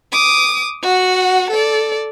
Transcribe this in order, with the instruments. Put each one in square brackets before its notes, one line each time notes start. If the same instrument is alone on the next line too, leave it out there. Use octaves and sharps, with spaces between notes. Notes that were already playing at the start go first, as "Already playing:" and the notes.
[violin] D6 D#6
F#4 F#5
A4 D5